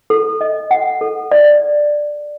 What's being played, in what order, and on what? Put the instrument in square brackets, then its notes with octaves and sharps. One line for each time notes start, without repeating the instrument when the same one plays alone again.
[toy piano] A4
D#5
F#5
A4
D5